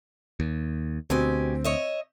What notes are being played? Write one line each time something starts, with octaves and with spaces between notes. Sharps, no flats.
D#2
D2 B2 C4 G4 G#5
C#5 D#5 E5